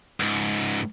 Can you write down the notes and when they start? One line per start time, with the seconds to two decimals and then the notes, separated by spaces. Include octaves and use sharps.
0.20 C#2 G#2